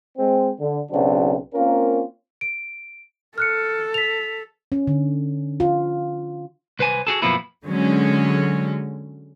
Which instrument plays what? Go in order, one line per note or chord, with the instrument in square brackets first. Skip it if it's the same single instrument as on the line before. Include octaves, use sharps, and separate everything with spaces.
[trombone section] G#3 C4
D3
B1 C#3 F#3 C4 D4
A#3 C4 C#4 F4 A#4
[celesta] D7
[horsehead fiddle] A4 [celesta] F6 F#6 C#7
[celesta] B6 F7
[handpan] C#4
D3
F4
[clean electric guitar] C2 B4 C5 G#5
F#4 G#4 A4
F#2 B2 F3 A#3 B3 E4
[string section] D3 F#3 G#3 C#4